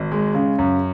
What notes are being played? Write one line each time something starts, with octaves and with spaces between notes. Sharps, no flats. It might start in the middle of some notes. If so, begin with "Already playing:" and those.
Already playing: G#1
G#3
C#3
F#2